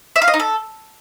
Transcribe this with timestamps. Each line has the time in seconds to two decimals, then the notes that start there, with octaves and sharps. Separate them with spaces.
0.16 E5
0.22 F5
0.28 D#5
0.34 D#4
0.40 A4